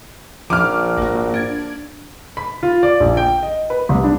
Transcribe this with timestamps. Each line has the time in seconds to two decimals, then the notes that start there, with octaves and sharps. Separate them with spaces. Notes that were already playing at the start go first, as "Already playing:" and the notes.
0.50 A#1 F3 D6 F6
0.97 G#1 A#3 F#4
1.34 D4 G#6
2.37 B5
2.63 F4
2.83 D5
3.00 A#1
3.17 G5
3.43 D#5
3.70 B4
3.89 C2
4.04 D4